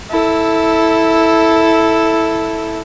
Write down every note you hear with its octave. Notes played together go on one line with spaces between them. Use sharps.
E4 A4